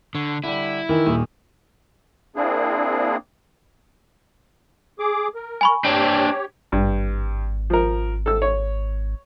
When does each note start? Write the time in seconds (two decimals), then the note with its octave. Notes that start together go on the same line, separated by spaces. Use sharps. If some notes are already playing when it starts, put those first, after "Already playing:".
0.15 D3 C#5
0.44 D3 G3 E4
0.89 D#3 E3
1.06 D#1 D#3
2.36 A#3 C4 D4 E4 G#4
4.99 G#4 D6
5.35 A#4
5.61 G#5 B5 C#6
5.85 D4 G4 C5 C#5 G5
6.72 G#1 G2
7.70 F3 A#4
8.26 A4 E6
8.42 C#5